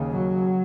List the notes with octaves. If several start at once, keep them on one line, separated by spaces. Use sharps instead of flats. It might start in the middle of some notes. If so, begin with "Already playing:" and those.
Already playing: D#2 C#3
F#3